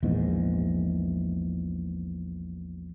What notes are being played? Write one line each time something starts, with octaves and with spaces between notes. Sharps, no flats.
A#1 E2 G#2